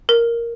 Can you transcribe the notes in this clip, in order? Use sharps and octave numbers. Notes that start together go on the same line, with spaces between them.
A#4